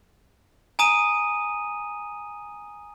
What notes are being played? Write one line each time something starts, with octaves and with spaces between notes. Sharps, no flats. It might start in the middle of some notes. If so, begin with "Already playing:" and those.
G#5 A#5 D#6 D#7